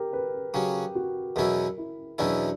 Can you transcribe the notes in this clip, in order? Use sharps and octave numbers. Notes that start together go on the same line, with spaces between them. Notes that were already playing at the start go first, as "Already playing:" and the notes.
Already playing: G4 A#4
B4
C#3 F#3 C#4 G4
F#4
E2 B2 F#3 C#4 E4 A#4
E4
E2 B2 F#3 C#4 D4 E4